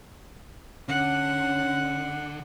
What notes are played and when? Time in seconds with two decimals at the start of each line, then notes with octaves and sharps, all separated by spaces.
0.88 D3 C#4 F#5